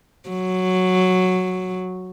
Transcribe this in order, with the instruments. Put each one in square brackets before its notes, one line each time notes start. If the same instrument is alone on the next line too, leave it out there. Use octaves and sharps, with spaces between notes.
[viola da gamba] F#3